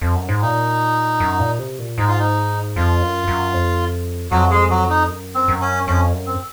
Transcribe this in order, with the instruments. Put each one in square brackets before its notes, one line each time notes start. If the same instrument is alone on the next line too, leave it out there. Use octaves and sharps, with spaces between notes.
[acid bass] F2
F#2
G#2
[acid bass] A#2 [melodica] D#4
[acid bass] F#2
A#2
C3
A#2
[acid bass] G#2 [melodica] D#4
[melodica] F4
D#4
[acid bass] F2 [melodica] F4
[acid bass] F#2
F#2
F2
[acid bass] F2 [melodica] F#3 F#4
[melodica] G#3 G#4
F#3 F#4
D#4
[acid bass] F#2
[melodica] C4
[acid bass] F#2
[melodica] C#4
[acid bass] F2 [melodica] C#4
[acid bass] F#2
[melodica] C4